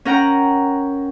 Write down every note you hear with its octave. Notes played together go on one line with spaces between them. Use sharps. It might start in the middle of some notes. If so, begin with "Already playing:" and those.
C#4 A#4 F#5 G5 A#5